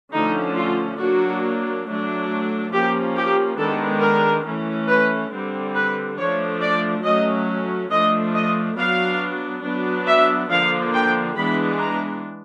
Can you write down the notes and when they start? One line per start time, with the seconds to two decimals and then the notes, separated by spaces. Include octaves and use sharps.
0.14 D3 F3 A3 C#4 D#4
0.57 F4
1.00 F#3 A#3 D4 F#4
1.86 F#3 A3 D4
2.73 F3 A#3 C#4 G4
3.16 G4
3.59 D#3 G#3 B3 D4 A4
4.02 A#4
4.46 E3 A3 C#4
4.89 B4
5.32 D3 G3 C4
5.75 B4
6.18 F3 A3 D4 C#5
6.61 D5
7.04 F#3 A3 C#4 D#5
7.91 F3 A3 D4 D#5
8.34 D#5
8.77 F#3 B3 D4 F5
9.64 F#3 B3 D4
10.07 E5
10.50 D3 F3 A#3 D4 F5
10.94 G5
11.36 E3 G#3 B3 D4 B5
11.80 A#5